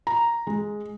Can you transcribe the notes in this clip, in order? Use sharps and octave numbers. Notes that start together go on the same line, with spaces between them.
A#5
G#3